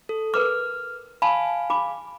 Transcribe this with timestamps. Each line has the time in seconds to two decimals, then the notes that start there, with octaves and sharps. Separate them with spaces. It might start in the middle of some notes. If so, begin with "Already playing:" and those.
0.09 A4
0.34 A#4 B4 D6 F6
1.22 F5 G#5 A5 B5
1.70 G#4 B5 D6